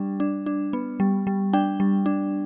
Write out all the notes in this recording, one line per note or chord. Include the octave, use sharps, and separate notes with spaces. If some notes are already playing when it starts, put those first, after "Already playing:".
Already playing: G3 D4
D4
D4
B3
G3
G3
D4 G5
G3
D4